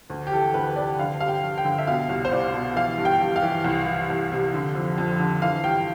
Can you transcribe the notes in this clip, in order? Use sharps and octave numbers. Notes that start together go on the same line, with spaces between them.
D2
G4
E3 A4
D2 B4
C3 D5
D3 F5
G2 F5
G5
G2
G5
D3
E5
B2 F5
C2
C5
C2 D5
B2
E3 F5
G2
G5
G2
F5
E3
C2
E3
C2
C3
D3
F2
F2
D3
E3 F5
G2 G5